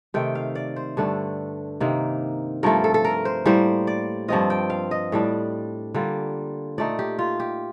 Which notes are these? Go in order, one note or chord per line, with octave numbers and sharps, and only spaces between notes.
C3 D#3 A3 G5
F5
D5
C5
G2 D3 A3 D4
C3 D#3 A#3
G2 F3 A3 A#4
A4
A4
A#4
C5
A2 G3 A#3 C5
D5
G2 F3 C4 F4 D#5
G5
F5
D#5
A2 G3 D4
D3 G3 A#3 F4
A#2 A3 D#4 D5
G4
F4
G4